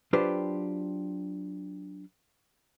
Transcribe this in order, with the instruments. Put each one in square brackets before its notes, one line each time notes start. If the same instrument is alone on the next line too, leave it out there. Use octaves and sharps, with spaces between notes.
[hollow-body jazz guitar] F#3 D4 F4 G4 B4 C5